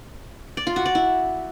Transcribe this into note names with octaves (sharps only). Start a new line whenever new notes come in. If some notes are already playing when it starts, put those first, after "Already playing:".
D5
F4
F#4
D5
E4